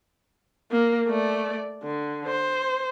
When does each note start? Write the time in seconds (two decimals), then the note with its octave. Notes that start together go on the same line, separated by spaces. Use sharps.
0.72 A#3
1.08 A3 D5
1.83 D3
2.27 C5